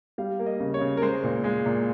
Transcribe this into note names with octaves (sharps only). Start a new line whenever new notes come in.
G3 F5
A#3
D#5
C#3
C#5
C#3
A#4
G#3 C5
A#2
G#3
A#2